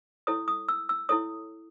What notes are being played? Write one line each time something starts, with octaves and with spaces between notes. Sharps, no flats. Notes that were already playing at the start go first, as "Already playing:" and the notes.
E4 A4 C#5 D#6
D#6
E6
E6
E4 A4 C#5 D#6